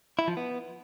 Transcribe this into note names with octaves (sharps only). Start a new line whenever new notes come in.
E4
F3
B3